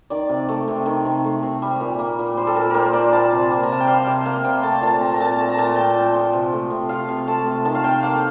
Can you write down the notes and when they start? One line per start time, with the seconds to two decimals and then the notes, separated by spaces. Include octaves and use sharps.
0.10 D#3 D5
0.29 C3
0.49 A3
0.68 C3
0.86 D#3
1.05 C3
1.24 A3
1.43 C3
1.62 G3
1.80 A#2
1.99 A#3
2.19 A#2
2.37 G3 C5
2.47 A4
2.56 A#2 A#4
2.70 A#3 A#4 C5
2.93 A#2 D5
3.12 G3 A5
3.32 C3
3.51 A#3
3.63 A#5
3.69 C3 A5
3.80 G5
3.87 G3 F5
4.07 C3 F5
4.25 A#3 F5
4.44 C3 G5
4.63 A3 A5
4.82 A#2 A5
5.01 C4 A#5
5.14 A#5
5.20 A#2 A5
5.38 A3 A5
5.49 A#5
5.58 A#2 A5
5.76 C4 G5
5.96 A#2
6.14 F3
6.33 C3
6.52 A3
6.70 C3
6.89 F3 F5
7.09 C3
7.28 A3 A5
7.46 C3
7.65 D#3 A5
7.75 F5
7.84 C3 G5
8.02 A#3 F5